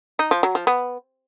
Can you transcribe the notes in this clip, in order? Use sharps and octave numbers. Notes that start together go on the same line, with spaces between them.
D#4
F3
F#3
F3
B3